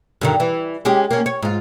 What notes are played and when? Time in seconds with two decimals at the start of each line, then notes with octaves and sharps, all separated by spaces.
0.21 G2 D3 D#3
0.40 E3
0.85 G#3 C#4 G4
1.11 A#3 C#4
1.26 C#5
1.42 G#2 F4